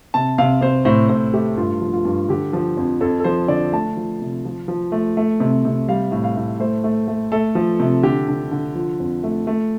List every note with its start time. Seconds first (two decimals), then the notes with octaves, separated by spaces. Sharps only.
0.14 C3 A5
0.38 C3 F5
0.61 C3 C5
0.85 A2 C5
1.09 A2 C5
1.33 A3 G4
1.57 G2 F4
1.82 F3
1.93 F4
2.05 G2
2.29 D3 G4
2.53 F3
2.77 F2
3.01 F2 A4
3.20 A4
3.24 F3 C5
3.48 D3 D5
3.72 A3 A5
3.97 F3
4.21 C3
4.45 F3
4.68 F3
4.92 A3
5.17 A3
5.40 C3
5.65 C3
5.89 G3 F5
6.12 A2
6.24 F5
6.37 A2
6.60 A3 C5
6.84 A3
7.08 A3
7.32 A3 A4
7.55 F3
7.80 C3
8.03 D3 G4
8.28 D3
8.51 D3
8.75 F3 F4
9.00 F2
9.23 A3
9.47 A3